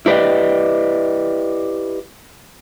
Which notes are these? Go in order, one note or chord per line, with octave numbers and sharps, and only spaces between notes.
E4 G4 B4 D5 D#5